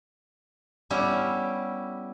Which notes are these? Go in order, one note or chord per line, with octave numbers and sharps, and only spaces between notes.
G3 B3 C#4 E4